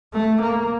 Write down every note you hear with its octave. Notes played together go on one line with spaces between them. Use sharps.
A3
A#3